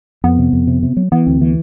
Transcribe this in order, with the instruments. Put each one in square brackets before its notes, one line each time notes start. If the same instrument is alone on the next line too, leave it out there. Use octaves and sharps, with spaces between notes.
[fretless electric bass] F2 [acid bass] B3
[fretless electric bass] C3
F2
C3
C3
F#3
[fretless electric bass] E3 [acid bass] B3
[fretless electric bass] D2 [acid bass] C4
[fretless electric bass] E3 [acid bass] B3